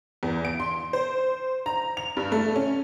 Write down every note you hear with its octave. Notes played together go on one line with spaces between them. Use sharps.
E2
D7
C6
C5
A#5
F7
G2
A3
C#4